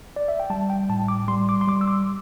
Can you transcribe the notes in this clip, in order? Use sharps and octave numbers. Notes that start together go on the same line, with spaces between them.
D5
E5
G5
G3 A5
G5
A2 A5
D6
G3 C6
D6
C6
G3 D6
E6
D6